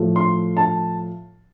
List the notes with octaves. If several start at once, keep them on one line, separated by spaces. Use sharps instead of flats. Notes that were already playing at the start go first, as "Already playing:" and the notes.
Already playing: A2 F3 A3
C6
A5